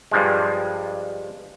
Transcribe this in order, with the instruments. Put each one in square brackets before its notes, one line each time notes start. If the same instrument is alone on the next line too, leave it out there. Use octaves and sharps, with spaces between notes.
[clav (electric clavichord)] G2 F3 G#3